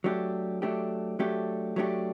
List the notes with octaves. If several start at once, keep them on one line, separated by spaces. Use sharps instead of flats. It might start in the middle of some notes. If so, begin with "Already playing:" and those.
F#3 A3 D4 G4
F#3 A3 D4 G4
F#3 A3 D4 G4
F#3 A3 D4 G4